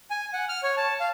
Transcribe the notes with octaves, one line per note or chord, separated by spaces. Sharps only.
G#5
F#5
F6
C#5
A5
F5